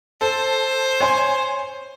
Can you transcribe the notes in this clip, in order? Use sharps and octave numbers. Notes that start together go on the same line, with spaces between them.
A4 C5
C#5 G#5 C6